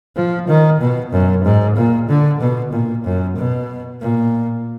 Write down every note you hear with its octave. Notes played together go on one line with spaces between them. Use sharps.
F3
D#3
B2
F#2
G#2
A#2
D3
B2
A#2
F#2
B2
A#2